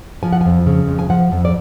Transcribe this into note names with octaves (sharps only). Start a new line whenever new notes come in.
F3 G#5
F#5
F2 G#5
C#3
F2
G#5
F3 F#5
F2
D5